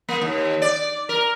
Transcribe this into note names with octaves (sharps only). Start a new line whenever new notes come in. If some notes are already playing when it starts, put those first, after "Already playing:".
A#3
D#2
D5
A#4